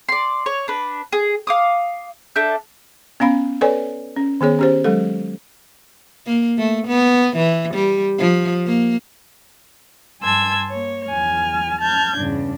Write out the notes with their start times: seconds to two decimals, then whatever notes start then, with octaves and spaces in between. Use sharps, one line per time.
0.09 D5 C6
0.46 C#5
0.68 D4 B4
1.12 G#4
1.47 F5 D6 D#6
2.36 D4 A4 E5 G6
3.20 B3 C#4 F5 B5
3.61 A4 B4 C#5 D5 G#5
4.16 C#4
4.41 D#3 B3 G#4 C#5
4.59 C#4 G4 C5
4.84 F#3 G#3 A4
6.26 A#3
6.58 A3
6.87 B3
7.36 E3
7.74 G3
8.18 F3
8.66 A#3
10.22 G2 G#5 A5 C6 E6 G#6
10.69 A#3 C#5
11.07 E2 G#5 F6
11.81 A5 F6 G6 G#6
12.17 E2 G2 C#3 D4